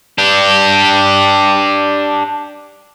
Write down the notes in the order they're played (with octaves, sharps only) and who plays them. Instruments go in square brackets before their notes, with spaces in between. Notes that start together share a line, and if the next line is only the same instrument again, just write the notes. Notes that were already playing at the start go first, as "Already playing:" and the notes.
[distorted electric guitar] D4 G4